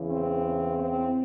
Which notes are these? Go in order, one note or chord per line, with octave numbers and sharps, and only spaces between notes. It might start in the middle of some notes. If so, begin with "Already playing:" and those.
Already playing: E2 C#3 E3
C4
C4